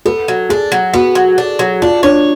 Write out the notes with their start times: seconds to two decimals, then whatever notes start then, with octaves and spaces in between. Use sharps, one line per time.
0.05 B3 A4
0.28 F#3
0.49 D4 G#4
0.72 F#3
0.94 B3 F#4
1.15 F#3
1.38 D4
1.59 F#3
1.82 D4 F4
2.03 D4 C#5